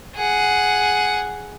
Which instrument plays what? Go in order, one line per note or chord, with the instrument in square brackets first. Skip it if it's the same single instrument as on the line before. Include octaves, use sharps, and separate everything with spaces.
[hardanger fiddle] G#4 F#5